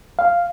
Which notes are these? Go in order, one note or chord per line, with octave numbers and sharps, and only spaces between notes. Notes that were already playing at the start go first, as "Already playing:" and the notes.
F5